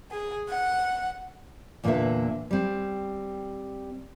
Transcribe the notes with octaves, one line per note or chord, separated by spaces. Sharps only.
G#4
F#5
E2 A#2 D3 A#3 B4 E5
G3 C4